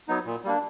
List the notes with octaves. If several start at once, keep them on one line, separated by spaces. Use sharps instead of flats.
F#3 B3 D#4
A#2
G3 A#3 D4